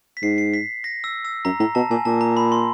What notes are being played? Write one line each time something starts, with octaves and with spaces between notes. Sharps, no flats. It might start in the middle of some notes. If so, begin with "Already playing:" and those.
B6
G#2 C7
C7
B6
A#6
E6
E6
F#2 A#5
A2 A#5
B2 A5
A#2 G#5
A#2 A5
A#5
B5
C6